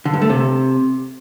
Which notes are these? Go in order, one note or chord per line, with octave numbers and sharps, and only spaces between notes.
D3
G2
A3
C3